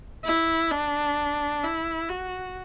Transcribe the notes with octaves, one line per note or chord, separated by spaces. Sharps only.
E4
D4
E4
F#4